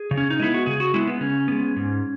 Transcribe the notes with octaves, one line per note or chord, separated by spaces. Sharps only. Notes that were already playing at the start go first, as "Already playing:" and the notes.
Already playing: G#4
C#3
C#4
D#4
G#3 B3 E4
F#4
C#3 G#4
F#4
G#3 B3 E4
B3
C#3 C#4
G#3 B3
G#2